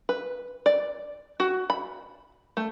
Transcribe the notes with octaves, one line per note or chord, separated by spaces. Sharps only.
B4
D5
F#4
B5
A3